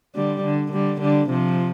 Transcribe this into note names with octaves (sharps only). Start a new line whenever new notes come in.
D3 G3
D3
D3 G3
D3 G3
C3 F3